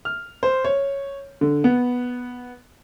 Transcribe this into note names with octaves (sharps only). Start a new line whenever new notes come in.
F6
C5
C#5
D3
B3